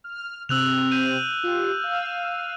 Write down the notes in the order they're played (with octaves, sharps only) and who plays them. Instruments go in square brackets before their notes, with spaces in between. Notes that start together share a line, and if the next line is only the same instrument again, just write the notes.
[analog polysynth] F6
[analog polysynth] C3 C4 [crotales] E6 F#6 F7
[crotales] G6 D#7
[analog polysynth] F4 G4
F5 E6 F6